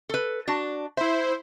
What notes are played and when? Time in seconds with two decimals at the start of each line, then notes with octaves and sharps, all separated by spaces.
0.09 A4 B4
0.48 D4 F#4 A5
0.97 E4 C5 E5